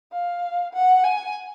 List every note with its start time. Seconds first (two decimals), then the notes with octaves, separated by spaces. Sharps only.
0.13 F5
0.74 F#5
1.04 G#5